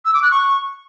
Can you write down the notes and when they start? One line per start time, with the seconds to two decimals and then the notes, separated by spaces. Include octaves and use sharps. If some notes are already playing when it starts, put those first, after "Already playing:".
0.05 E6
0.14 D6
0.23 F#6
0.31 C#6